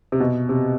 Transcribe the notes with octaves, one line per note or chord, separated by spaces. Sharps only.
C3
B2
C3